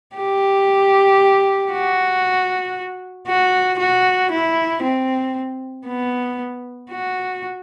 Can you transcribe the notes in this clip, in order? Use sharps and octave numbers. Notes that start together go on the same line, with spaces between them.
G4
F#4
F#4
F#4
E4
C4
B3
F#4